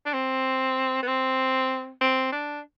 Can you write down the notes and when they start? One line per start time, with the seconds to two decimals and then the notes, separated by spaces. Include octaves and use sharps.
0.06 D4
0.14 C4
1.02 B3
1.07 C4
2.01 C4
2.32 D4